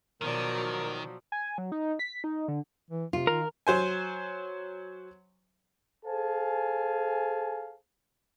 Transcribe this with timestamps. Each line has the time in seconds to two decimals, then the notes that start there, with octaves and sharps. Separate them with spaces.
0.22 B2 D#3 F3 F#3 A#4 C#5 D5
1.32 G#5
1.58 F#3
1.72 D#4
1.99 B6
2.24 D#4
2.48 D3
2.90 E3
3.13 C3 F4
3.27 D#3 A#4
3.67 F#3 C5 G#5
6.06 G#4 A4 C5 F5 G#5 A5